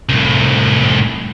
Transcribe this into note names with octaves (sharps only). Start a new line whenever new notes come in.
C2 A2